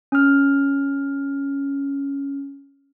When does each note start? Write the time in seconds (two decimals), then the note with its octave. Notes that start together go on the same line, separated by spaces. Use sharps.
0.12 C#4 F6